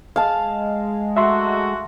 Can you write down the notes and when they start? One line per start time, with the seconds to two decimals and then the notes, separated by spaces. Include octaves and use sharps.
0.16 G#3 F5 A5
1.17 F#3 A3 F#4 E5 C6